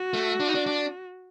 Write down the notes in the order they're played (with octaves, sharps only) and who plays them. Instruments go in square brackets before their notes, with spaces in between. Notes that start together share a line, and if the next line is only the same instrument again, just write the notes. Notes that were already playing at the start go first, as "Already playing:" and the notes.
Already playing: [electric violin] F#4
[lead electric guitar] A3
D4
D#4
D4
D4